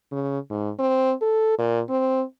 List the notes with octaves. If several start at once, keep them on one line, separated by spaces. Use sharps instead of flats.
C#3
G#2
C4
A4
A#2
C4